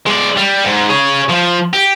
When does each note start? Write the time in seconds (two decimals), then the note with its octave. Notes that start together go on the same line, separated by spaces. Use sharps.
0.06 G#3 D5
0.37 G3
0.64 G#2
0.89 G#4 C#5
1.29 F3
1.73 G4